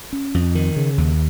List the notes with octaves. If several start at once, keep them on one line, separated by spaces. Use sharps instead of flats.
C#4
F2
D#3
C#3
D#2